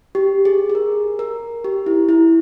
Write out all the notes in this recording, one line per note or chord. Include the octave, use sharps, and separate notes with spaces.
G4
G#4
G#4
A#4
A#4
G4
E4
E4